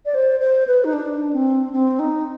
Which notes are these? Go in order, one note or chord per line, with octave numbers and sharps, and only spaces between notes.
D5
C5
C5
B4
D#4
D4
C4
C4
D#4